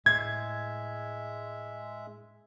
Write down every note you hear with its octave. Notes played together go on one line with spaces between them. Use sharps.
A2 G#3 E5 G#6